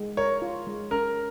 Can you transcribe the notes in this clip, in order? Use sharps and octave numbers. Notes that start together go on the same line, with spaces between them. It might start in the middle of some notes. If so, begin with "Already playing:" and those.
Already playing: G#3
A#4 C#5
F4
G#3
C#4 A#4